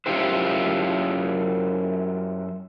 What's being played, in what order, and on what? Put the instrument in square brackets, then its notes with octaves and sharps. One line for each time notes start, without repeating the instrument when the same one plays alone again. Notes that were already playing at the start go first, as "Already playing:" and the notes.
[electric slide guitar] F#2 B2 E4 F4 G4 C5